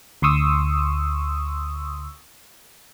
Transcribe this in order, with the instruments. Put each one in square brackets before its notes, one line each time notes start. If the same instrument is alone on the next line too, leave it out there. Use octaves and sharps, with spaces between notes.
[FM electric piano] D2 C6 C#6 D#6 E6